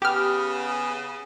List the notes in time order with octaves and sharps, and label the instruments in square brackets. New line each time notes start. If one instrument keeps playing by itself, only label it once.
[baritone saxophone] C#3 [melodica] B3 [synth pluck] G4 F6